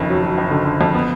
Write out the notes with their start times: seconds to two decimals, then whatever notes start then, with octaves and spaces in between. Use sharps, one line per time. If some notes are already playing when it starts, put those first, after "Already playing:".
Already playing: F#1 F2 D#3
0.09 F#3
0.23 F#3
0.38 F#1
0.51 D3
0.65 D3
0.81 F2
0.94 B3